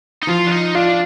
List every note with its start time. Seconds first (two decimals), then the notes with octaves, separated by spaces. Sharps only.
0.23 D#4
0.27 F3 F4
0.47 D4
0.51 D#4
0.75 D4 F4